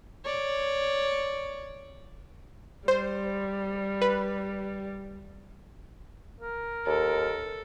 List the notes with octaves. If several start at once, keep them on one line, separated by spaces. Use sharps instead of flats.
C#5 D5
G3 C5
B4
A#4
D#2 A4